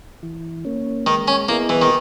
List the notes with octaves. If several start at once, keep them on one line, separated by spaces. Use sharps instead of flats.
E3
A#3 C#4
D#3 G#3
C#4
A#3 B3 E4 G#4 D#5
E3
D#3